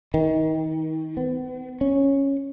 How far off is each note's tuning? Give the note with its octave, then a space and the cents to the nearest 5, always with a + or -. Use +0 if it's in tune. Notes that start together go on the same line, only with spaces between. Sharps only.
D#3 +30
B3 +45
C#4 -5